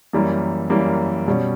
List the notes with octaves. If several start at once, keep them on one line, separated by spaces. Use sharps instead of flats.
F#2 E3 G3 A#3
F#2 E3 G3 A#3
B2 G3 C#4